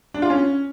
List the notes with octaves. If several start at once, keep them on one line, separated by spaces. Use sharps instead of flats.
D4
F4
C#4